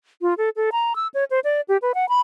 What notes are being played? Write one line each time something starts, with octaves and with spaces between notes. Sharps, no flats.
F4
A4
A4
A#5
E6
C#5
C5
D5
G4
B4
F#5
B5